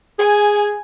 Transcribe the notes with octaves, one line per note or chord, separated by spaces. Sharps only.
G#4 G#5